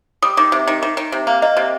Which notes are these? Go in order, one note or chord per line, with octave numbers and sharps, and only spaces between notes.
G3 D#6
D#3 D6
C3
D#3
D#3 D6
D#3
C3
A#3
A#3 D#5
C3